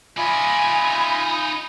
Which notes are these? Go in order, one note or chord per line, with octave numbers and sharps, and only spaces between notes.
D#4 F4 D5 E5 G#5 B5